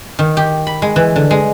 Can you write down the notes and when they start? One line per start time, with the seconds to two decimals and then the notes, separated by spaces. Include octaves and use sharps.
0.19 D#3
0.37 G4
0.67 B5
0.82 G#3
0.96 E3
1.16 D3
1.31 G#3